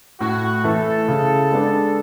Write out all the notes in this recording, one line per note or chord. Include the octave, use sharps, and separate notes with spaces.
A2 F#4
E3 A3 A4
C#3
G#3 B3 D4